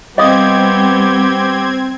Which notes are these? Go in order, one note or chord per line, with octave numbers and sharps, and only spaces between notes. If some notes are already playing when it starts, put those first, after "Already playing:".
G3 B3 C4 G4 D#5 F5 D#6 G#6